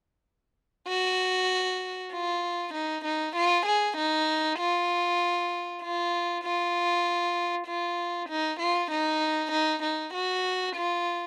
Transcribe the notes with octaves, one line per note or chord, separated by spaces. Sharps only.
F#4
F4
D#4
D#4
F4
G#4
D#4
F4
F4
F4
F4
D#4
F4
D#4
D#4
D#4
F#4
F4